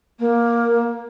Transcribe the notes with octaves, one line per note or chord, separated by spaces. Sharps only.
A#3